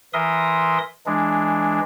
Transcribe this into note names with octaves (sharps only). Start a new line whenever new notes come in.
E3 A#4 E5 C6 D#6
E3 G#3 D4